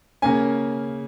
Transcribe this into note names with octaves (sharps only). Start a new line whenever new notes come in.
C#3 A#3 C#4 G#5